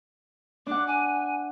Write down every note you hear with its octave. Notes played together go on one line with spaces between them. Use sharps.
D4 F#5 D6
G#5